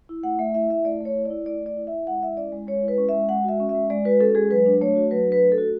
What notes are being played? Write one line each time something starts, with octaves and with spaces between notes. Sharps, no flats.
E4
A3 F#5
A3 E5
E4 E5
E4 E5
A3 D5
A3 C#5
E4
E4 D5
A3 D5
A3
D5
E4
E5
E4
G#3 F#5
E4 E5
C#4 D5
G#3
G#3 C#5
E4
B4
C#4
G#3 E5
G#3 F#5
F#4 E5
C#4
E5
G#3
G#3 D5
F#4 B4
C#4 A4
G#3 G#4
F#3 B4
D4
A3 C#5
F#4
F#3 B4
D4
B4
A3
A4
F#4